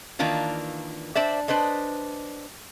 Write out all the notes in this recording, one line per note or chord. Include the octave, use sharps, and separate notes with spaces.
D#3 E3 A#3 D4 F4
D4 C5 D5 E5
D4 B4 C5 D#5